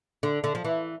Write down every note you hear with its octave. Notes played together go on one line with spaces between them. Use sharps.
D3
D3
F3
E3